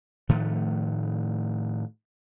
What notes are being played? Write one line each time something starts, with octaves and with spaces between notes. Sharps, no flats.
A2 D#3 F3 A3